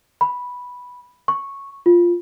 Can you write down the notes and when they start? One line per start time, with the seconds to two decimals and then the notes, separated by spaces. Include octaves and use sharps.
0.21 B5
1.28 C#6
1.86 F4